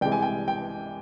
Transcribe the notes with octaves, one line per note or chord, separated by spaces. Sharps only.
C2 C3 E3 G#3 G5
G#5
G5
G5